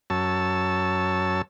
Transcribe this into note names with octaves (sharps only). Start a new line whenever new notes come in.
F#2 C#5 A5 E6